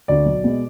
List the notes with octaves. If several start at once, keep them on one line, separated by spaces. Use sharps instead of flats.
D2 D3 D5
B1
B2 G#3 B3